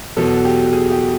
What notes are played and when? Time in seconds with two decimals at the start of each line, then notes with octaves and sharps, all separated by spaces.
0.17 E2 B2 F#3 A4
0.45 G4
0.73 G#4
0.91 G4